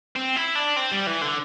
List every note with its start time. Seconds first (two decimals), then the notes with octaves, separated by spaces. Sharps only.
0.16 C4
0.36 E4
0.55 D4
0.76 C4
0.92 G3
1.07 E3
1.22 D3